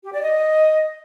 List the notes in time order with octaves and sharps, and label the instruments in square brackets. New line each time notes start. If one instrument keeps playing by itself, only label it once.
[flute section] G4
D5
D#5